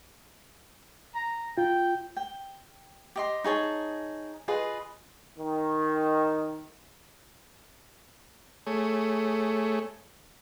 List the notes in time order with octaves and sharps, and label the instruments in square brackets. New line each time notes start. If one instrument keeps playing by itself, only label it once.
[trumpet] A#5
[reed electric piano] F4 [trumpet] G5
[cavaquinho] G5
G4 D#5 C6
D#4 G#4 C#5 A5
F4 G#4 B4 D#5
[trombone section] D#3
[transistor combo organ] A3 G#4 C#5